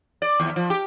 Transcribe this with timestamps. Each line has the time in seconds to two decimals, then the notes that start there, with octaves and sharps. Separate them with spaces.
0.22 D5
0.40 D#2
0.56 F3
0.70 G4